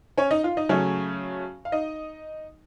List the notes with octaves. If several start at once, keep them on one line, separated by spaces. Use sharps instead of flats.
C#4 C#5
D#4 D#5
F4 F5
D#4 D#5
C#3 F#3 A3 C#4 C#5
F5
D#4 D#5